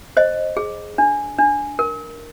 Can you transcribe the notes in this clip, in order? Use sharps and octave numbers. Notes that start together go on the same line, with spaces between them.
C5 D#5
G#4
D4
D4
A#4